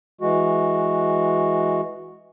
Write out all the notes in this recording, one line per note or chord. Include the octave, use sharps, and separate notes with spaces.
E3 G#3 F#4